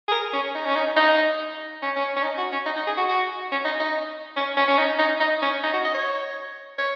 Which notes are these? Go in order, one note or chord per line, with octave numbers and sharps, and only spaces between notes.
G#4
A#4
C#4
D#4
C#4
D#4
D#4
C#4
C#4
C#4
D#4
F#4
C#4
D#4
D#4
G#4
F#4
F#4
C#4
D#4
D#4
C#4
C#4
C#4
D#4
D#4
D#4
C#4
D#4
F#4
D#5
C#5
C#5